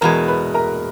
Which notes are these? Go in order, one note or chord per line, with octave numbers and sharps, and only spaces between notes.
E2 B2 G#3 A#4 A#5
B4 B5
A#4 A#5